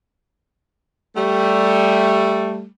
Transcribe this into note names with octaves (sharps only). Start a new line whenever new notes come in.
G3 A3